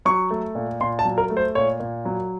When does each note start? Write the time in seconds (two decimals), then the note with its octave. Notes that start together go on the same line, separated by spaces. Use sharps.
0.05 F#3 C#6
0.30 A3
0.55 A#2
0.80 A#2 C6
0.99 A5
1.05 F#3
1.18 A#4
1.30 A3
1.37 C5
1.55 A#2 C#5
1.80 A#2
2.05 F#3